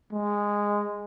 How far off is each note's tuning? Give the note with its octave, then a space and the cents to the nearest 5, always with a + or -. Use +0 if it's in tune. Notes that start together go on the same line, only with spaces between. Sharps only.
G#3 -10